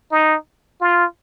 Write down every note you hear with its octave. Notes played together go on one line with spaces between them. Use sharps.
D#4
F4